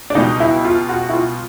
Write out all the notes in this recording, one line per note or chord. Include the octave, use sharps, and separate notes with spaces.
D4
C#2 B2 G3 D#4
E4
F4
F#4
E4
F4